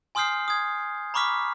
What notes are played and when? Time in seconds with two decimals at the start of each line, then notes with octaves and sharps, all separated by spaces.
0.15 G#5 C6 D#6 F6 G6 C7
0.48 D#6 G#6
1.14 A#5 B5 C#6 D6 F6 B6